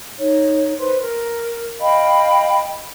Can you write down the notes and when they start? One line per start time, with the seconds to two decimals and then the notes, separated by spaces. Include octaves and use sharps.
0.19 D#4 C#5
0.79 B4 C5 C6
1.01 A#4
1.80 D#5 F5 G5 B5